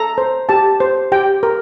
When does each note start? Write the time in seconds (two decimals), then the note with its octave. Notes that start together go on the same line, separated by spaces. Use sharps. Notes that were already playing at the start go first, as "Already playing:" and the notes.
Already playing: A4 A#5
0.18 C5
0.49 G4 A5
0.80 C5
1.12 G4 G5
1.43 A#4